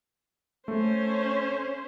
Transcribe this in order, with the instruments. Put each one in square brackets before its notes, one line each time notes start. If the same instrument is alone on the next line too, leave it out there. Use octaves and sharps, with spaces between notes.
[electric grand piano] A3 [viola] C#4 C5